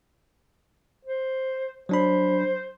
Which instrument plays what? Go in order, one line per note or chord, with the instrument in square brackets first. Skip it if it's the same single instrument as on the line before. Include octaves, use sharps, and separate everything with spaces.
[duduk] C5
[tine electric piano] F#3 D4 B5 [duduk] C5